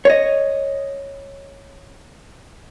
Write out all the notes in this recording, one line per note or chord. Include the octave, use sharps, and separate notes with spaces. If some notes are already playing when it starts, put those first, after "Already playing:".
C#5 D#5